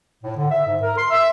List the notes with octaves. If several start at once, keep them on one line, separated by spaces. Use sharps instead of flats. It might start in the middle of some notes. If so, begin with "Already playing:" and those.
A2
D3
E5
G#2
A#4
C6
E5